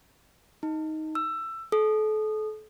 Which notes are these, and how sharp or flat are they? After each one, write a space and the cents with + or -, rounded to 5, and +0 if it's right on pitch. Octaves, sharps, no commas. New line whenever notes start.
D#4 +10
E6 +15
A4 -35